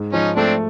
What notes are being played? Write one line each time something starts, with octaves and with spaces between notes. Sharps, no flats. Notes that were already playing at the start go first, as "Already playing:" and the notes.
Already playing: G#2
F3 C#4 D#4
A3 C4 D4